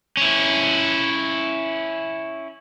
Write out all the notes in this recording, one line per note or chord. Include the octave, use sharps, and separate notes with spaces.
C#4 E4